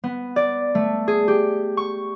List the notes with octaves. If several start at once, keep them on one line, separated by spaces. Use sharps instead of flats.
B3
D5
A3
G#4
G4
C#6